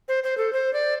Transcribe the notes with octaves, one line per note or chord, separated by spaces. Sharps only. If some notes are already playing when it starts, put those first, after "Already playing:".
C5
C5
A4
C5
D5